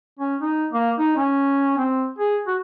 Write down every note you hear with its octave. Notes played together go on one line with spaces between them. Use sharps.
C#4
D#4
A#3
D#4
C#4
C4
G#4
F#4